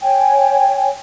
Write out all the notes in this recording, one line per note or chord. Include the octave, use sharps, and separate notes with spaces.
C#5 G5 G#5